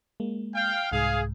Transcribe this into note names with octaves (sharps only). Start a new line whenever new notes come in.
G#3 A#3
F5 G5
C2 G#2 G#4 F5